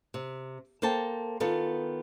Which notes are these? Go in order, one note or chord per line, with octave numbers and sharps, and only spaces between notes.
C3
A#3 A4 C5 G5 A5
D#3 B3 F4 A4